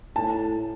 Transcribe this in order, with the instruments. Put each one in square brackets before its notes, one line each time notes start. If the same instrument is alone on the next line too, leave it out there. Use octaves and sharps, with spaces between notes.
[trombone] A2 [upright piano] A5